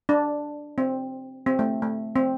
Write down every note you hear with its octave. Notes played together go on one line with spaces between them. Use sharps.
D4
C4
C4
A3
A3
C4